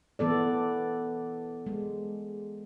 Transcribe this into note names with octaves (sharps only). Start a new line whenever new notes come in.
E3 B3 A4 D5
G#3